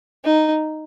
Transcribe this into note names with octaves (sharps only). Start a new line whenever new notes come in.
D#4